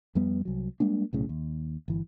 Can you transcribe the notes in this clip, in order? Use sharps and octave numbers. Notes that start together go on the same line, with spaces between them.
F2 G3 B3
C2 F#3
G3 G#3 A#3 D4
B1 A2 C#3
D#2
G1 E3